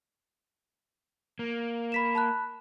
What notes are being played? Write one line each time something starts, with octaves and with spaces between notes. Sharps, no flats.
A#3
B5 B6 E7
A5 B5 F#6